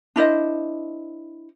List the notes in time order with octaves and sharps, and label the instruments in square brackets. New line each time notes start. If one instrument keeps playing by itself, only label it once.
[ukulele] D4 E4 C5 D#5